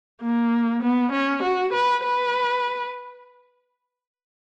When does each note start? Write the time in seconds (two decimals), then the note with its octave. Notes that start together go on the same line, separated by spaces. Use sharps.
0.21 A#3
0.82 B3
1.12 C#4
1.43 F#4
1.73 B4
2.04 B4